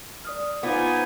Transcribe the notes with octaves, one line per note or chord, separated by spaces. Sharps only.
D5 D#6 F6
B3 D#4 F4 C5 F5 G#5 D6